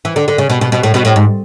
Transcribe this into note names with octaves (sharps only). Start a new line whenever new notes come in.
E3
D3
D3
C#3
B2
B2
B2
A2
B2
A2
G#2